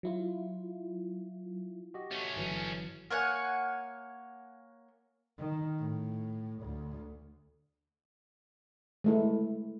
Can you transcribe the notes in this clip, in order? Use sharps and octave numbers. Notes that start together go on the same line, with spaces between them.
F#3 E4 F4
F#4 G4 D#5
A3 C#4
G1 E3 F#3
A#3 C#5 F#5 G#5
D#3
A2
D2
G#3 A3 E4